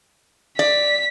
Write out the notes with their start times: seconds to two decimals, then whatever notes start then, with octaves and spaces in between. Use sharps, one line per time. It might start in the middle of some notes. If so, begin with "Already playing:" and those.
0.59 D5 B6